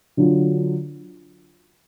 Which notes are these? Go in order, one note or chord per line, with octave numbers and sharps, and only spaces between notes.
D3 F#3 D4 F4